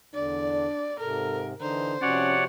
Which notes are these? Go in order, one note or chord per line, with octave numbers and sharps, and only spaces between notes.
E2 D3 D4 D5
G#2 C3 A4 A#4
D3 E3 D#4 C5 A#5
C3 F3 C#4 F#4 C#5 D5 F#5